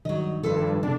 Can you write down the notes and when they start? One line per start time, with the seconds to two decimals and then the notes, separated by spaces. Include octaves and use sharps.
0.05 G2 D#3 F#3 D#5
0.43 G2 D#3 F3 A4 B4 C5
0.83 E2 C3 D#3 D4